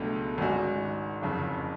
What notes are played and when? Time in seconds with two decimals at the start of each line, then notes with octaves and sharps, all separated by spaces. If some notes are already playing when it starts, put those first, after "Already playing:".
Already playing: C#2 B2 F#3 A3 D4
0.38 G#1 G#2 G#3 C#4 F#4
1.21 F#1 F2 C#3